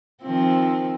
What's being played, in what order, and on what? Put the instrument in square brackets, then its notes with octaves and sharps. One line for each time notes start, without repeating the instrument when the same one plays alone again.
[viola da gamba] D#3 F3 C4